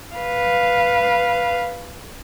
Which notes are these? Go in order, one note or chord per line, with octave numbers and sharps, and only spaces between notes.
B4 F5